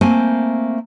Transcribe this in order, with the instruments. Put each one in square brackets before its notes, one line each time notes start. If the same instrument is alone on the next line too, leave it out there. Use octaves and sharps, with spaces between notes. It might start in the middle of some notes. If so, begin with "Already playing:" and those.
[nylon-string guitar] A3 A#3 C4 G#5